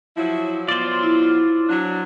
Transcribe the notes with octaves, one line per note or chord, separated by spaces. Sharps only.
F3 F#3 E4
B2 F#3 F4 C5 D5
E4
F#3 D4